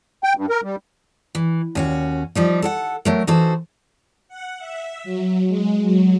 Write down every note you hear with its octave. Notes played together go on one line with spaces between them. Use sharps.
G5
G2
A#4
G3
E3
D#2 C#4 F#4
F3 G3 D#4
A4 D5 F#5
F#3 A3 A#4
E3 D#4 F#4 A4 C5
F#5
E5
F#3
G#3
F#3